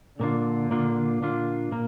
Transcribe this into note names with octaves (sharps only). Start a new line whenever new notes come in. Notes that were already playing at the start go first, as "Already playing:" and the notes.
A#2 D3 A#3 D4 F4
A#2 A#3 D4 F4
A#2 A#3 D4 F4
A#2 A#3